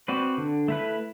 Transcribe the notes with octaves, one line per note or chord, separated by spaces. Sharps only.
C4 F#4 B4 D5
D3
A3 E4 B4